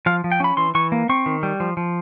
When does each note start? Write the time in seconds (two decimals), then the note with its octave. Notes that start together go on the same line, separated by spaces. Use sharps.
0.06 F3 F5
0.24 F3
0.32 G5
0.40 C#4 B5
0.57 E3 C6
0.75 E3 C#6
0.92 A#3
1.09 C4 C#6
1.26 D#3
1.43 G3
1.60 F3
1.77 F3